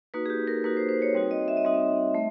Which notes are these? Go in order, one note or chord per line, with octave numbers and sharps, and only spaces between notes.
A#3 D#4 F#4 B4
G#4
G4
A#4
A#3 D#4 F#4 B4
C5
C5
C#5
G3 C4 D#4 F#4
D#5
E5
D#5
G3 C4 D#4 F#4 E5
A3